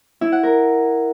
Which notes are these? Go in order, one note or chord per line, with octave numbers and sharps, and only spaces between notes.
E4
F#5
A#4